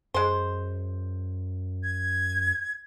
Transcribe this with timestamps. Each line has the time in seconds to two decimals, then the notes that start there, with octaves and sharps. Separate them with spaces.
0.14 F#2 G#3 C5
1.83 G#6